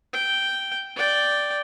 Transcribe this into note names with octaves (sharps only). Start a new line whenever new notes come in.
G5
D5 G5